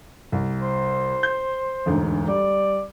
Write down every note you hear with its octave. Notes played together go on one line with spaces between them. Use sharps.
C2
C5
G6
E1 D2 G#2
G3 D5